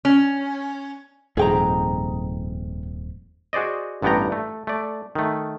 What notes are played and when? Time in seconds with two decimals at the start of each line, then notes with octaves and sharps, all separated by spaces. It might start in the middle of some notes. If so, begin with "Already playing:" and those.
0.05 C#4
1.37 D#1 F2 G#2 G#4 G5 A#5
3.53 F#4 G#4 C5 D5 D#5
4.02 A1 G2 B3 D5 G5 A#5
4.32 A3
4.67 A3 D5
5.15 D#3 A3